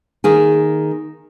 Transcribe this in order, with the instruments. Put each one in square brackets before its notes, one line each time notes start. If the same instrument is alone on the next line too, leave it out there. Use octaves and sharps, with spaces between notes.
[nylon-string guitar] D#3 A#3 G#4